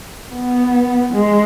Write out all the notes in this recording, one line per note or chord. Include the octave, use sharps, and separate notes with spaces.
B3
G#3